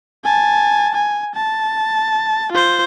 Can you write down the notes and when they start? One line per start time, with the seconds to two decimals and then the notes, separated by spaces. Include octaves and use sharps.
0.25 G#5 A5
0.95 G#5
1.35 A5
2.52 F4 C5